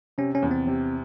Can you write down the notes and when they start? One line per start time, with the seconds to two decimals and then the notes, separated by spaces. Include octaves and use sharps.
0.18 C3 C#4
0.35 C#4
0.43 E2
0.51 C4
0.67 C3